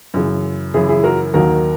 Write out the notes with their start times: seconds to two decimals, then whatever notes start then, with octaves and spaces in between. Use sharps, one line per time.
0.14 F#2 C#3 E3
0.74 F#2 C#3 E3 E4 G#4
0.89 E4 G#4
1.04 F#4 A#4
1.34 D#2 D#3 F#3 F#4 A#4